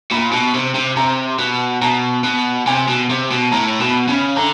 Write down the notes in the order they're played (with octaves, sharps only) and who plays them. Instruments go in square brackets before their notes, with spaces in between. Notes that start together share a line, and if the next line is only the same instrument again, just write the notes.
[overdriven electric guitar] A#2 [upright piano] B5
[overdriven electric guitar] B2
C3
C3
[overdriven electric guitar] C3 [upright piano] A#5
[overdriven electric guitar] B2
[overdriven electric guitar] B2 [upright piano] A#5
[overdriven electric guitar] B2
[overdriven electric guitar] C3 [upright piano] G#5
[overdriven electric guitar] B2
C3
B2
[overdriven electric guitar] A2 [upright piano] A#5
[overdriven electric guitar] B2 [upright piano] B5
[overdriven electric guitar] C#3 [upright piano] B5
[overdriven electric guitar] D3 [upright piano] A#5